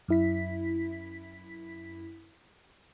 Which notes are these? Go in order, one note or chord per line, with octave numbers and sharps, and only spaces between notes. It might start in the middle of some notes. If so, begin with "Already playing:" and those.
F#2 E4 B6